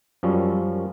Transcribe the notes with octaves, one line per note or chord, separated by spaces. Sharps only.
F#2 F3 G3 C#4